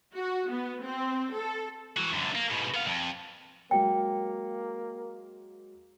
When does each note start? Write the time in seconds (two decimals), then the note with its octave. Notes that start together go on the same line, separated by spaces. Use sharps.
0.14 F#4
0.51 B3
0.83 C4
1.33 A4
1.97 E3 F#4
2.13 F#2 D3
2.35 A#3
2.50 G#2 B2
2.74 B3 F5
2.87 F2
3.71 F#3 G#3 A#3 G5